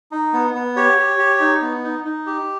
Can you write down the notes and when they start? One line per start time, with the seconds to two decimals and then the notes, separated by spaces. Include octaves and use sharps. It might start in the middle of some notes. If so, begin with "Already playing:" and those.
0.12 D#4
0.33 B3
0.54 B3
0.76 G4 C#5
0.98 G4
1.18 G4
1.40 D#4
1.62 B3
1.84 D#4
2.04 D#4
2.26 G4